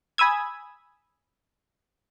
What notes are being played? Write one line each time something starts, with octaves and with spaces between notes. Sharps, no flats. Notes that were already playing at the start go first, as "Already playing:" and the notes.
G#5 B5 D#6 E6 G#6